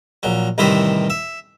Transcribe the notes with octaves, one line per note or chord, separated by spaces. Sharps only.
A#1 F#3
C2 A2 D#3 E3 C5 E5
E5